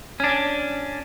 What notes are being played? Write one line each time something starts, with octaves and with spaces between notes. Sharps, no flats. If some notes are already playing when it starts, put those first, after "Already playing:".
C#4 D4